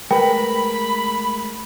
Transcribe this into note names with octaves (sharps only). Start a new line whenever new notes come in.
G#3 A3 A#4 B4 G5 B5